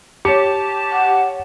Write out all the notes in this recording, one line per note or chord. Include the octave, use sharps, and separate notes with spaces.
G4 C#5 A5 C#7
F#5